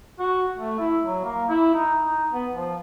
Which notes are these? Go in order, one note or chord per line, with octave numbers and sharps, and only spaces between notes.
F#4
A3
E4
F#3
A#3
E4
D#4
D#4
B3
F3